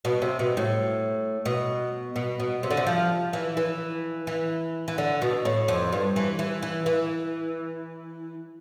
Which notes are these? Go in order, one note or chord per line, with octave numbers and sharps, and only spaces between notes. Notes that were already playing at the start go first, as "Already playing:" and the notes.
B2
C3
B2
A2
B2
B2
B2
C3
D3
C3
F3
E3
E3
E3
E3
D3
B2
A2
F2
G2
E3
E3
E3
E3